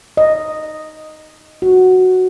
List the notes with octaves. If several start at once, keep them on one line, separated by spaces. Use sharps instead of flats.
D#5
F#4